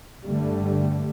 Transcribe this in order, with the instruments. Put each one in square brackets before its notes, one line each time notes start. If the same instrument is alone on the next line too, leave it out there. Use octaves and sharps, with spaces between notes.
[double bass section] G#1 G2 D3 G3 A3